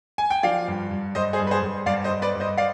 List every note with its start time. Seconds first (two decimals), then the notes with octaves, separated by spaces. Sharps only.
0.18 G#5
0.30 G5
0.43 F3 D5 F5
0.68 G2
0.91 G2
1.15 G2 C5 D#5
1.33 G#4 C5
1.39 G2
1.47 B4
1.51 G#4 C5
1.62 G2
1.86 G2 D5 F5
2.04 C5 D#5
2.11 G2
2.22 B4 D5
2.35 G2
2.40 C5 D#5
2.58 D5 F5